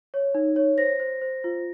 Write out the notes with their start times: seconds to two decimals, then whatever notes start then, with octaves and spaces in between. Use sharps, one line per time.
0.14 C#5
0.35 D#4
0.56 C#5
0.78 C5 A#6
1.00 C5
1.21 C5
1.44 F4